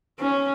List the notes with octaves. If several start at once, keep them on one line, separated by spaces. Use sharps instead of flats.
C#4